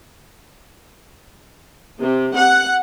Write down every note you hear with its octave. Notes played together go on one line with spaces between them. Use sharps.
C3
F#5